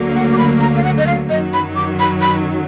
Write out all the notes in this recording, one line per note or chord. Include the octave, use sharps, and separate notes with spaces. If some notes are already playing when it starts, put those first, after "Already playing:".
Already playing: D2 D3 F#3 A#3
F#5
D6
B5
A#5
F5
F#5
D#5
F5
F#2 D#3 F#3 D#5
B5
D6
B5
B5